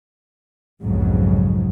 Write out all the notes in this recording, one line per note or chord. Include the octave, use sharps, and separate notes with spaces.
B1 F2 G#2 C#3 F#3